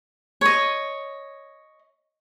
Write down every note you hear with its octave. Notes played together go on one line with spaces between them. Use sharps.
C#5 D#5